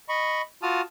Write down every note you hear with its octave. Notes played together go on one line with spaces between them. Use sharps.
D#5 B5 C#6
F4 F#4 A5 D#6 F6